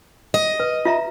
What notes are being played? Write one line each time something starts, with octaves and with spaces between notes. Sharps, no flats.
D#5
B4
F4 E5 A#5